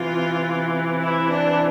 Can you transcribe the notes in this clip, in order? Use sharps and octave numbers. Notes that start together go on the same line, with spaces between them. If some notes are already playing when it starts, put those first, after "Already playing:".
Already playing: C3 E3 F4
E4
D4